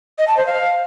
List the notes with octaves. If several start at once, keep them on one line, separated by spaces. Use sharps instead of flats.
D#5
A5
C5
F5